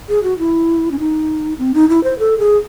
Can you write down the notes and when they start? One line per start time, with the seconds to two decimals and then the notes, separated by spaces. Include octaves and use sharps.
0.09 G#4
0.23 F#4
0.39 E4
0.91 C#4
0.99 D#4
1.59 C4
1.74 D#4
1.89 E4
2.04 C5
2.19 A4
2.39 G#4